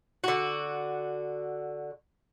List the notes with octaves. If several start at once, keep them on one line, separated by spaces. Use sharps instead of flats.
D3 F#4